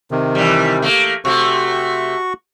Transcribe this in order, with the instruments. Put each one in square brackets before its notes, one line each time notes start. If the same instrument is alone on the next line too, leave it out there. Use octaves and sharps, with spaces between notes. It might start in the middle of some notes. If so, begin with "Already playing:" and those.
[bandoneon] C3 D#3
[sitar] E3 G3
A3 A#3
[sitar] C3 A3 [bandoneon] F#4 C#6